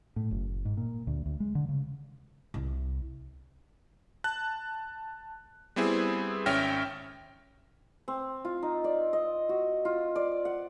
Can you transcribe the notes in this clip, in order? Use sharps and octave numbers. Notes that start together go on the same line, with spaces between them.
A2
F#1
G#2
A#2
D2
D2
G#3
D3
C#3
C2
A5 F#6
G3 B3 C4 E4 G#4
G#1 C#4 E5 G5 F6 A#6
C4
F4
D#4
D5
D#5
F#4
F4
D5
F#5